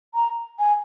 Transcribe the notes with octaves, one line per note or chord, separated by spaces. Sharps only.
A#5
G#5